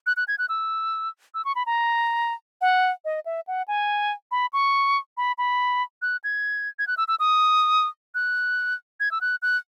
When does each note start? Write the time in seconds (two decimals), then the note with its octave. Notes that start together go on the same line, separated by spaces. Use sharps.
0.06 F#6
0.17 F#6
0.28 G#6
0.38 F#6
0.49 E6
1.34 E6
1.45 C#6
1.55 B5
1.66 A#5
2.61 F#5
3.05 D#5
3.25 E5
3.47 F#5
3.68 G#5
4.31 B5
4.53 C#6
5.17 B5
5.38 B5
6.02 F#6
6.24 G#6
6.79 G#6
6.87 F#6
6.97 E6
7.08 E6
7.20 D#6
8.15 F#6
9.00 G#6
9.11 E6
9.21 F#6
9.42 F#6